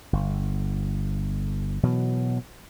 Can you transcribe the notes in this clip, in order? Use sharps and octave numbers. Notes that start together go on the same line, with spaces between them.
G1
B2 E3 F#3